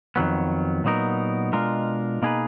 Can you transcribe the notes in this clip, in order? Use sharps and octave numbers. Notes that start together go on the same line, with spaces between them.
F2 D#3 F#3 B3
A#2 F#3 B3 D#4 A#4
B2 G#3 D4 F4 A#4
B2 A#3 D#4 G#4 B4